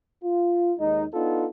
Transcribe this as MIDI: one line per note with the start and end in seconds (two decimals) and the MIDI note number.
0.23 0.73 65
0.79 1.05 39
0.79 1.05 56
0.79 1.05 63
1.13 1.47 59
1.13 1.47 62
1.13 1.47 63
1.13 1.47 65
1.13 1.47 69